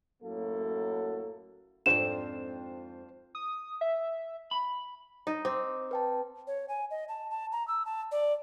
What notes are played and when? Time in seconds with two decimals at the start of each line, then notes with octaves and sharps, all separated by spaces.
0.23 F#2 A2 F#3 A#3 A4
1.86 F2 G#2 C4 D4 F4 C5 E7
3.35 D#6
3.81 E5
4.51 B5
5.27 D#4
5.45 C4 D6
5.91 B4 G5 A5
6.47 C#5
6.69 G#5
6.91 D#5
7.09 A5
7.30 A5
7.52 A#5
7.68 E6
7.86 A5
8.12 D5